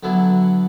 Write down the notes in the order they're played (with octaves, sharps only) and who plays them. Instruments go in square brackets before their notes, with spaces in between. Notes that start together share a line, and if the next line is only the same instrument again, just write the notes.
[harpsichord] D3 F#3 B3 E4